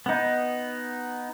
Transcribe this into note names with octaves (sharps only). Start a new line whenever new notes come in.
B3 D#4